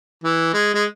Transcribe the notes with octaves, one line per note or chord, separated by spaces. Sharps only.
E3
G#3
G#3